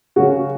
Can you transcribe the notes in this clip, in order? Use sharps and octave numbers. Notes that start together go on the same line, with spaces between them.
C#3 F#3 C#4 F#4